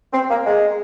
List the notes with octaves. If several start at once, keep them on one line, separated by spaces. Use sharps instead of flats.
C4
A#3
G#3